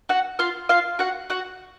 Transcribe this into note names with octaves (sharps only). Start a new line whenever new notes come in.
F#4 F#5
F4 F5
F4 F5
F#4 F#5
F#4 F#5